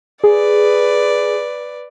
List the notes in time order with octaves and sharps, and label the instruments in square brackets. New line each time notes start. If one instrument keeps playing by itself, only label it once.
[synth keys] G#4 [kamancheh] B4 D5